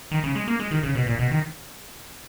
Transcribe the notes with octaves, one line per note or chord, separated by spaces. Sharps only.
D#3
C#3
G#3
A#3
G#3
D#3
C#3
B2
A#2
B2
D#3